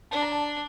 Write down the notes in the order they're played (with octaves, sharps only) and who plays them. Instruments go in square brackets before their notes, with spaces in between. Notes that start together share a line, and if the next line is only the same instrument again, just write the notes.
[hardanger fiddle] D4 [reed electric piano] A5
[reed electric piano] A#5
A5